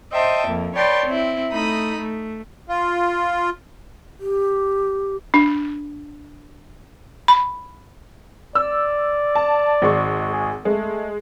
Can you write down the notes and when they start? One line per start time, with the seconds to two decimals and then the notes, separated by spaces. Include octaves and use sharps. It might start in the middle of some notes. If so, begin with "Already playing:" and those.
0.11 C5 D#5 E5 G5 A5
0.46 F2 A#3
0.75 B4 C#5 D5 G5 A5 C6
1.05 C4 E4
1.52 A3 D#4 D#5 B5
1.98 A3
2.68 F4
4.20 G4
5.34 D4
7.28 B5
8.55 D5 E6
9.35 A5
9.82 G#1 G#3 C#6
10.32 G#4
10.65 G#3 A3